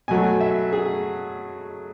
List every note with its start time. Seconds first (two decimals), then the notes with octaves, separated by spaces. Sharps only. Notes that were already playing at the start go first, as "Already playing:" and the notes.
0.08 B2 F#3 A3 G#5
0.40 E5
0.72 G#4